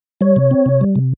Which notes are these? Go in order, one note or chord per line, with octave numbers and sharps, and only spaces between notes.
G3 C#5
C3
C4
C3
G3
C3